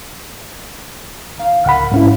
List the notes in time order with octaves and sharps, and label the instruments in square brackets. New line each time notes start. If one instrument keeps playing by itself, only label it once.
[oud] D#3 F5
[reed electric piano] C#2 F#5 B5 [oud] F3 A#4
[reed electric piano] G#2 C#4 E4